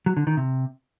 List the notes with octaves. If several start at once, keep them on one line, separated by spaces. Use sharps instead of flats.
F#3
D3
D#3
C3